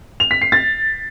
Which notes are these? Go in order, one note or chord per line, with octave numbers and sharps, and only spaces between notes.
F7
B6
C7
A6